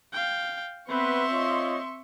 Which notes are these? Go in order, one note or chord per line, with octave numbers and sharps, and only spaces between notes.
F5 G5
B3 C4 B4 E5 C6 C#6
F4 C#5 D#5